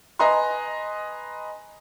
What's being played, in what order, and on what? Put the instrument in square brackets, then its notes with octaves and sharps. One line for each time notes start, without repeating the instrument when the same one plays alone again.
[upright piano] B4 D#5 G#5 A#5 C6